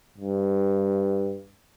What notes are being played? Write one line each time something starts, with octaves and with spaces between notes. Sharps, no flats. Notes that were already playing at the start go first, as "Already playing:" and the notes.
G2